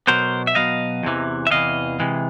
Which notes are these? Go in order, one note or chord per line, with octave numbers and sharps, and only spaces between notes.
B2 F#3 B3 A#4 C5
E5
B2 F#3 B3 D#5 F5
E2 C3 E3
E5
E2 C3 E3 D#5 F5
C3 E3 G#3